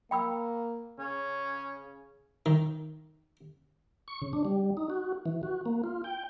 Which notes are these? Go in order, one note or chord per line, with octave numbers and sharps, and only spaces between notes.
A#3 G5 B5 E6
C#3 C#4
D#3
C#6
C#3
D4
G3
D#4
F#4
E3
F#4
A#3
F4
G5